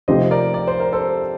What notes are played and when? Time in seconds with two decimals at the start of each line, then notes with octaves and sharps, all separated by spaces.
0.08 C3 F3 A3 D#4 G4 C5 D#5
0.31 A#4 D5
0.54 D5
0.67 C5
0.80 A#4
0.93 A4 C5